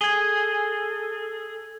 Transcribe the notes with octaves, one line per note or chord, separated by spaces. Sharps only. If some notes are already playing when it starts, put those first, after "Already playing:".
G#4 A4 G#6 G7